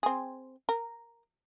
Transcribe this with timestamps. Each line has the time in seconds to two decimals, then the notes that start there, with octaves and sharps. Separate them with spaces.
0.03 C4 G#4
0.69 A#4